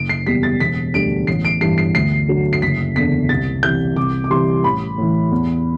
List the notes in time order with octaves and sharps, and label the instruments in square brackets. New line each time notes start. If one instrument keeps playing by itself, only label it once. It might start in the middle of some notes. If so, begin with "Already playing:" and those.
Already playing: [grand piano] F#1 D7
C7
E2 B2 G3 B6
A6
E1 B6
D2 D3 G3 D7
A1 C7
D7
G2 E3 C7
C7
D2 C7
D3 F#3
C7
F#1 B6
E2 D3 B6
C2 A6
C3 E3 G6
C2 D6
D6
C3 E3 G3 C6
A1 B5
A2 E3
E2